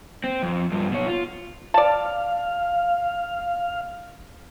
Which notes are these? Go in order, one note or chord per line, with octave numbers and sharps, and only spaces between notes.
C4
F2
G2 F3
B2 C#5
F4
D5 F5 A5